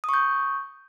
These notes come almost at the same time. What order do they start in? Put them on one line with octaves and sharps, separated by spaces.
D#6 C#6 G6